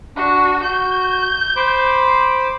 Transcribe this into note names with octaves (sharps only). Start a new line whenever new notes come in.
D4 F#4
F#4 G6
C5 B5 D6